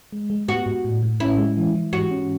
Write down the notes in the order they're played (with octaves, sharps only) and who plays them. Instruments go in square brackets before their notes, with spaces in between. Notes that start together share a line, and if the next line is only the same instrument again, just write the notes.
[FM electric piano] G#3
G#3
[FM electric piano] B3 [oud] F#4
[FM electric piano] G#2
A2
A2
[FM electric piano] C#4 [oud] E4
[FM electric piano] G#3
E3
E3
[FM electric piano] G#2 [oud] F#4
[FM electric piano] C#4